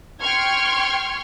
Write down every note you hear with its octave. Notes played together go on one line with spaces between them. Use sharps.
G5 C6 C#6 F6 G#6